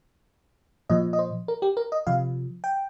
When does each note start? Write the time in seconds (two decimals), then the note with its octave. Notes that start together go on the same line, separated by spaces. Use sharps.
0.90 A#2 F3 D#5
1.13 D#5
1.19 C5
1.48 A#4
1.62 G4
1.77 A#4
1.92 D#5
2.07 C3 F3 F5
2.64 G5